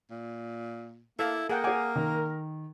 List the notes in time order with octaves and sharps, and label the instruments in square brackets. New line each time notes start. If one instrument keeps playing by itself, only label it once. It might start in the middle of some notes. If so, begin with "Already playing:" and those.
[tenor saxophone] A#2
[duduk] A#3 [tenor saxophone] E4 [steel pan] A4 E5 F5
[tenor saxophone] A#3 [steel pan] G#4 F#5 G5 [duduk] A#4
[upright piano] G#4 F#5 [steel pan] G#5 D6
[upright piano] D#3